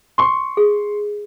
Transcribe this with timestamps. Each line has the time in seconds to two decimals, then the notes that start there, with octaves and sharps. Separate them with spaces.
0.18 C6 C#6
0.57 G#4